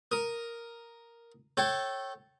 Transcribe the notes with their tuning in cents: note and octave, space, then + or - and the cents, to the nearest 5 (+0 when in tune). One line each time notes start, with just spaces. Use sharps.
A#4 +0 D#6 +0
A4 +0 C#5 -25 G5 -20